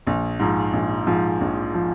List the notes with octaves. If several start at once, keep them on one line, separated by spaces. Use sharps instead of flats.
A#1
G#2 F3
A#1
G#2 F3
A#1
F3